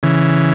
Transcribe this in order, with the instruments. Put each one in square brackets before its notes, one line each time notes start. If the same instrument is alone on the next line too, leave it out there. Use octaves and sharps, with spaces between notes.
[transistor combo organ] C#3 E3